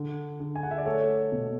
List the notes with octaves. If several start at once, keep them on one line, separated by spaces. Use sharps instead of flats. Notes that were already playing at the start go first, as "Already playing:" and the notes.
Already playing: D3
D3
G#5
F#5
E5
D5
A3 A4 C#5
B2